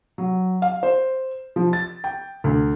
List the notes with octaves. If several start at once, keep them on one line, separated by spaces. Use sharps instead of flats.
F#3
F5
C5
F3
A6
G5
D2